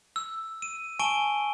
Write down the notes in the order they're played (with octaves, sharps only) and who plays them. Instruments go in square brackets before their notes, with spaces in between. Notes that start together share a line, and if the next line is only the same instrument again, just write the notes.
[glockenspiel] E6
D#7
G#5 A5 C#6 D7 D#7 G7